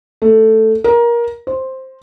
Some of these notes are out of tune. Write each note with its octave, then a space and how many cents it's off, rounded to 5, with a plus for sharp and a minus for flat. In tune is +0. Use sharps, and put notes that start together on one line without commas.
A3 +5
A#4 +20
C5 +5